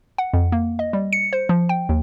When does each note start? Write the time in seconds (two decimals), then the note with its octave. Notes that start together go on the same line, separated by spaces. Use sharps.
0.18 F#5
0.33 F2
0.52 A#3
0.79 D#5
0.93 G3
1.13 C#7
1.33 C5
1.49 F3
1.69 G5
1.89 D#2